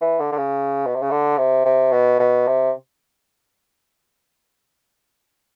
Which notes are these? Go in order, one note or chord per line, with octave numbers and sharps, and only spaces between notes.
E3
D3
D3
C#3
B2
C3
C#3
D3
C3
C3
B2
B2
C3